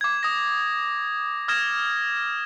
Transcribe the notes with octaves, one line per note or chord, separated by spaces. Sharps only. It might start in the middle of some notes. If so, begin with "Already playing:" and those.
D6 G#6
D#6 A#6
D#6 F6 G#6 A#6 E7